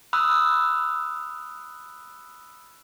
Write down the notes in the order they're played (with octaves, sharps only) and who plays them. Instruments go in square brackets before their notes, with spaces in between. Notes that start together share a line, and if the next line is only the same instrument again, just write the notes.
[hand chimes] B5 D#6 E6 F#6